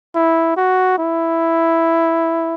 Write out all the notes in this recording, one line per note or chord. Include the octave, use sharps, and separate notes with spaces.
E4
F#4
E4